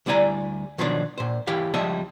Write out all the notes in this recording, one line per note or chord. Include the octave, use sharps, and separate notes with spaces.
D2 G3 E4 D5 G#5 A#5
B2 D#3 F3 F#3 D4 D5
A#2 C5
E3 E4 G4 F5
C#2 F3 G3 D#5 E5 A5